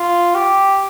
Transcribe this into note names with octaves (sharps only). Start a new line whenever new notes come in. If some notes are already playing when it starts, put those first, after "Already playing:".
Already playing: F4
G4